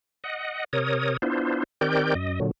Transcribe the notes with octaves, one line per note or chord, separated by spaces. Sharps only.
D#5 F#5
C3 A#4 C#5 D#6
B3 D4 E4 F4 C5
D#3 C4 G4 A#4 D5 G6
F#2 D#5
A#2 D3 F#3